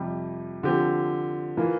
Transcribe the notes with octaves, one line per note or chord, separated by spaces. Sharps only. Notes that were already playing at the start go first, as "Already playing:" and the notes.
Already playing: F2 C3 G3
D3 F3 C4 G4
E3 A#3 F4